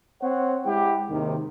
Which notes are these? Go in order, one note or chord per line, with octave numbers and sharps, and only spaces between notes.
C4 C#5 F#5
G#3 E4 G4 F#5 G5
D#2 G#2 C3 D#3